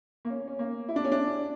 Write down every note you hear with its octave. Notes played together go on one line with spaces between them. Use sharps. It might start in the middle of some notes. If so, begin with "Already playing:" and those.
A#3
C#4
C#4
A#3
E4
D4
C#4
D4